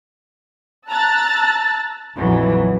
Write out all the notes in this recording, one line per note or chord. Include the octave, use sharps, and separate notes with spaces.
A5 A#5 E6 F#6 A6
A#1 F2 E3 F#3